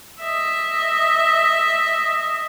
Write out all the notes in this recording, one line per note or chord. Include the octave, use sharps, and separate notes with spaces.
D#5 E5